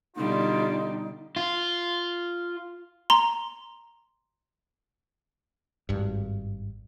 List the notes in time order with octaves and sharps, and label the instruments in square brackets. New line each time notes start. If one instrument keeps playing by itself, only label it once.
[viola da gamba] B2 D3 G3 [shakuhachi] D#4 [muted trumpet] F4
[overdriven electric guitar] F4
[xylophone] A#5 C6
[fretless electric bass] G#1 G2